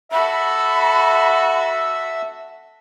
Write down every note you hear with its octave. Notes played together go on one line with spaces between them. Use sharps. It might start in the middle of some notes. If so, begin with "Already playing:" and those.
F#4 A4 E5 B5